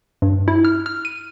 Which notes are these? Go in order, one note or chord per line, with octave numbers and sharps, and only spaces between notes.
G2
E4
F6
F6
D#7